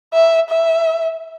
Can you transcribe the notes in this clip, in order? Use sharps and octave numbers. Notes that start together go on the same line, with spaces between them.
E5
E5